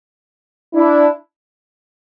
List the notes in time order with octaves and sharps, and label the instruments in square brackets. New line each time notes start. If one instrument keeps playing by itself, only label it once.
[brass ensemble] D4 E4